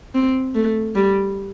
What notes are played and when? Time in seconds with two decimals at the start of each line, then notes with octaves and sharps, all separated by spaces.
0.15 C4
0.55 A3
0.96 G3